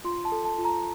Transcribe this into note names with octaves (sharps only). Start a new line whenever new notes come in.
F4 C6
A5
A4
A5
F4
A#5